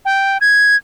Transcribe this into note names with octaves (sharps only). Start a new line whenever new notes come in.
G5
G#6